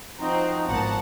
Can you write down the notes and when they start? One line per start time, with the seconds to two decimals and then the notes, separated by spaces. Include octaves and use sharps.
0.20 F3 C4 D#4 F#4 A#5
0.68 G#1 A#3 B3 F#5 A5